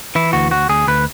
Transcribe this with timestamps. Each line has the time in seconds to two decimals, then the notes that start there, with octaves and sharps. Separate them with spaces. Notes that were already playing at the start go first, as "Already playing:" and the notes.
0.15 E3 E4
0.33 D2 F#4
0.51 D2 F#4
0.69 D2 G#4
0.87 D2 B4